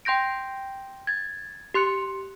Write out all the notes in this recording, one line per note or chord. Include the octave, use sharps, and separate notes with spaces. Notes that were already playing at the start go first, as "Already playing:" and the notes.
G5 C6 G6 A#6 D7
G#6 A6
G4 C6 F#6 C#7